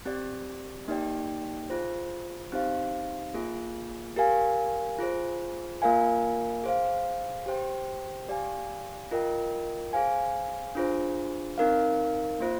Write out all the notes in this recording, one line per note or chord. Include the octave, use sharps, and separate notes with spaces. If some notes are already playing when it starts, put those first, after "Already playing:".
C4 G4 D5
A#3 D#4 G4 D5 G5
F4 G#4 C5
C4 D#4 G4 C5 F5
A#3 F4 G#4
G4 A#4 F5 G#5
F4 G#4 C5
A#3 F4 A#4 F5 G#5
G#4 C5 F5
G4 C5 G5
G4 D5 F5 G#5
F4 A#4 D#5 G5
G#4 C5 F5 G#5
D4 F4 G#4 C5
C4 D#4 A#4 F5
A#3 F4 C5